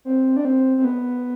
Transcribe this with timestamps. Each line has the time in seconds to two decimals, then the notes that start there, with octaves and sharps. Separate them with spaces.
0.05 C4
0.37 D4
0.45 C4
0.78 C4
0.85 B3